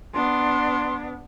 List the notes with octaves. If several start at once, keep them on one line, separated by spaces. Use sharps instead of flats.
B3 D4 C6